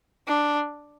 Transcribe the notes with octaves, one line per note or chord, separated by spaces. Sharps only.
D4